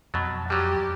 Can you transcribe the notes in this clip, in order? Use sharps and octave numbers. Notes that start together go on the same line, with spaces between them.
F2 B2 F#3 A5
F#3 G3 G4